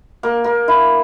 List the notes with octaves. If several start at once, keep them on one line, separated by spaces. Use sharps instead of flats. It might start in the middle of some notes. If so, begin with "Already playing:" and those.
A#3
A#3
E4